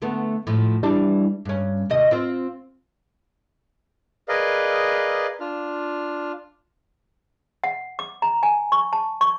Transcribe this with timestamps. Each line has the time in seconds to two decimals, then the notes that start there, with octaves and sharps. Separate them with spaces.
0.02 D3 A3 B3
0.47 A2 F3
0.83 E3 G3 D4
1.45 G2 C#4
1.90 D#2 C3 D#5
2.11 C4 F4 C5
4.29 G#4 A#4 B4 D5 D#5 F5
5.40 D4 F4 F6
7.64 F#5
7.99 D6
8.22 A#5
8.43 G#5
8.72 C#6
8.93 A5
9.21 C#6